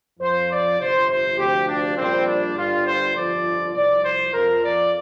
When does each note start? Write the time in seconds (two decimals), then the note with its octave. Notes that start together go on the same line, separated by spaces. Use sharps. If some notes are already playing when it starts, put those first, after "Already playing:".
0.20 F2 F3 C5
0.50 D5
0.79 G1 F2 C3 C5
1.09 C5
1.38 D2 C3 F3 G4
1.68 D4
1.97 A#1 A#2 G3 C4
2.26 D4
2.56 G1 G2 D3 G3 F4
2.86 C5
3.15 G1 F2 F3 D5
3.73 C2 C3 F3 D5
4.03 C5
4.32 F2 F3 A#4
4.62 D5